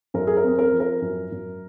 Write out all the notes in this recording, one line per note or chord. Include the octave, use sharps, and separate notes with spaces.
F#2 A#4
G#4
A#4
C4
A#4
F3
A#4
F#2
F#2